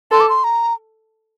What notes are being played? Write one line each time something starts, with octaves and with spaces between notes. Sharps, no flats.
A4 C6
D6
C6
A#5